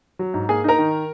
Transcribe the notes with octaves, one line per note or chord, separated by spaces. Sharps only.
F#3
G#2
A#3 G#4 G#5
D#4 A#4 A#5
D#3